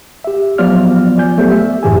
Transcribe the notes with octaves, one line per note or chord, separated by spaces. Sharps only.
G4 E5
F3 F#3 B3 F4 D5 F6
F3 D5 G#5 G6
F#3 A3 B3 G4 C5
E5
F#2 A2 E3 G4 G#4 G#5